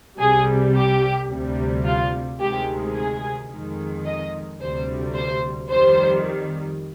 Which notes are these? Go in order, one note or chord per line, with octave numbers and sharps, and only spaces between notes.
C2 C3 G3 G#4
G4
D2 C3 G3
F4
D2 C3 D#3 G#3 G4
G#4
F2 D#3 G#3
D#5
D2 C3 G3 C5
C5
F2 D#3 G3 C5